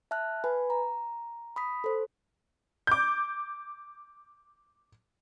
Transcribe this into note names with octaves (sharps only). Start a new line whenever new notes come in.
E5 A5 F6 F#6
B4 G#5 B5
A#5
B5 D#6 B6
A4 C5
D6 G6